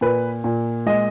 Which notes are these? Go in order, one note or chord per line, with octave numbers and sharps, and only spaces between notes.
A#2 B4
A#2
G#3 D#5